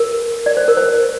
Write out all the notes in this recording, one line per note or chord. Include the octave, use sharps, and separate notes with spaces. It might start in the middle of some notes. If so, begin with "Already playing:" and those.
Already playing: A#4
D5
C5
A#4
C5